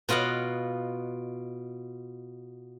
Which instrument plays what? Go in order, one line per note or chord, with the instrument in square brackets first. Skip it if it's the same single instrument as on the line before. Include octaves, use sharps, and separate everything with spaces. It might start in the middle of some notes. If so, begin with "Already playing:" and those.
[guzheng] B2 F4 D#5 F5 F#5